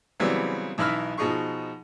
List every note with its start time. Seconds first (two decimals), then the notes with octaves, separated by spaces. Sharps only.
0.20 C#3 E3 F#3 G3 B3 C4
0.78 B1 E3 D#4 E4 B5 F6
1.18 B2 F3 D#4 G#4 C#6